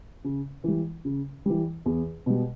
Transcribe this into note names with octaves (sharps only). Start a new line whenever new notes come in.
C#3
E3 G3
C#3
E3 G3
E2
B2 G3